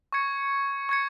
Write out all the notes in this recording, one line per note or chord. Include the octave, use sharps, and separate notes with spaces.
C#6 G#6 C#7
C#6 G#6 C#7